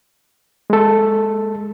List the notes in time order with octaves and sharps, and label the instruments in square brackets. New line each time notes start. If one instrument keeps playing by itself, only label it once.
[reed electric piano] G#3 A4